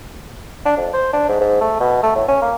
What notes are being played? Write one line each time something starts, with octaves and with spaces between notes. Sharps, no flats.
D4
F2
C5
D4
G#2
G#2
A3
B2
A3
A2
C#4
A#3